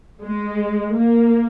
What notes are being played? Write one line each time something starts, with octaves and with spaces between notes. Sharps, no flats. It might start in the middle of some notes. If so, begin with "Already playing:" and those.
G#3
A#3